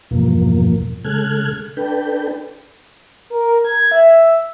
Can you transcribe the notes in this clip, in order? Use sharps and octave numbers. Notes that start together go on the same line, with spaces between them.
E2 G2 B2 F3 A#3
C#3 G#3 A4 F6 F#6 G#6
D4 A4 B4 G5
A#4
G#6
E5